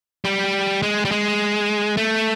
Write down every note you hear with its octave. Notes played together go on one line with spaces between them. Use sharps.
G3
G#3
G3
G#3
A3